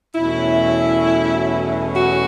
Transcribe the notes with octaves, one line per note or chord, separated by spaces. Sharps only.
E2 B2 F#3 A3 C#4 E4
F#4